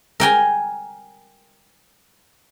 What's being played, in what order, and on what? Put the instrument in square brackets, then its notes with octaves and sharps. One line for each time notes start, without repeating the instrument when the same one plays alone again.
[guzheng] A#4 G5 G#5 A#5